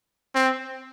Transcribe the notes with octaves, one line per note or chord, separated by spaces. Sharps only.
C4